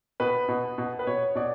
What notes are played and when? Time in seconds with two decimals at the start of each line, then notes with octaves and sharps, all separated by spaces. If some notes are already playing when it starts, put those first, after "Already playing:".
0.20 B2 B4
0.49 B2
0.78 B2
0.99 B4
1.07 B2 C#5
1.35 B2 D5